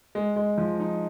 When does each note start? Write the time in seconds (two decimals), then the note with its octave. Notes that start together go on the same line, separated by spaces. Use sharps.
0.15 G#3
0.36 G#3
0.58 F3
0.80 D#4